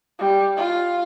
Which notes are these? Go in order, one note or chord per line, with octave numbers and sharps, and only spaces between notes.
G3
F4